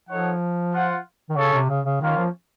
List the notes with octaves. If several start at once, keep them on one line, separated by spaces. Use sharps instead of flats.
F3 D#4 A4 C#5 F#5
F4 C5 F#5
D#3
C#3 C#4 A4 C#5
C3
C#3
C#3
D#3 A#3 C#4 F4 A#4 F5
F3